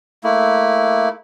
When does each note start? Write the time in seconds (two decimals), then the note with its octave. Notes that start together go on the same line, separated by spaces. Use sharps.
0.24 A3 A#3 E4